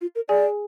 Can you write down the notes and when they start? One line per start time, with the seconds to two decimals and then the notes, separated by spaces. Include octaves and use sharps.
0.01 F4
0.15 A#4
0.28 G#4 D5 G#5